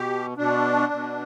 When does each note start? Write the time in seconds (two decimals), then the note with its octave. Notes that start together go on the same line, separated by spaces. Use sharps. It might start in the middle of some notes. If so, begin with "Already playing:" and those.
Already playing: B2 G4
0.38 B2 D4
0.92 B2